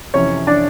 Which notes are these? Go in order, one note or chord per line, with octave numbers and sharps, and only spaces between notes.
F2 C3 E3 C#4 C#5
D4 D5